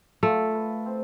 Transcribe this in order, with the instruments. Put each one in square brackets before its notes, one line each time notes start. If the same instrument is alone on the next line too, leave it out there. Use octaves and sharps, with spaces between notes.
[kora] A3 [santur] F4
[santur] B4
C4